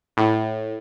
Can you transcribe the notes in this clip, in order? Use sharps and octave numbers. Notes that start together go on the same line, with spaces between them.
A2